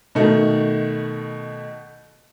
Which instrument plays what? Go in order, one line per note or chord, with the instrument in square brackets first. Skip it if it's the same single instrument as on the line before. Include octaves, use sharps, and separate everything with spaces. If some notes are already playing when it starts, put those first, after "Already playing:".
[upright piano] B2 D#3 A3